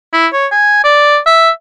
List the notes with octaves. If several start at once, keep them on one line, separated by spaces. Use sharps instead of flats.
E4
C#5
G#5
D5
E5